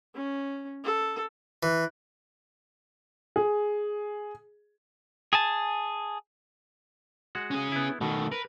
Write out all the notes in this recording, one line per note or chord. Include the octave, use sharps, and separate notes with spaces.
C#4
A4
E3
G#4
G#4 G#5 A5
G#3 F#4 F#5
C#4 G#4
B3 E4
B2 D#3 A3
A#4 B4